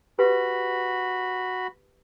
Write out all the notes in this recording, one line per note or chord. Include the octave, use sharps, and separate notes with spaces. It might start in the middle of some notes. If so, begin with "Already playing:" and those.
F#4 G4 B4 B5